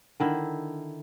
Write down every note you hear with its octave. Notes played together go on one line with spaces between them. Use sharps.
D3 D#3 E4